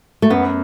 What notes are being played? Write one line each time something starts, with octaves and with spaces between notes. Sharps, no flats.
A3
F#2 B3